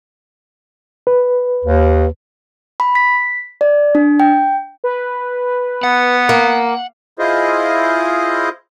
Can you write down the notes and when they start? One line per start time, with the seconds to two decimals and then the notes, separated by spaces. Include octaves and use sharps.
1.07 B4
1.65 D#2
2.80 B5
2.95 B6
3.61 D5
3.95 D4
4.20 G5
4.84 B4
5.83 B3 F#5
6.29 A#3
7.19 E4 F4 G#4 C5 D#5